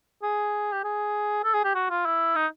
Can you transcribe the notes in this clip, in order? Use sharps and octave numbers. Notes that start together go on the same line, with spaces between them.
G#4
G4
G#4
A4
G#4
G4
F#4
F4
E4
D#4